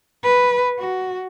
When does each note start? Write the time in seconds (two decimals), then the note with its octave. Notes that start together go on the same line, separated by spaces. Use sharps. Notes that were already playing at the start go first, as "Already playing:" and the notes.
0.24 B4
0.79 F#4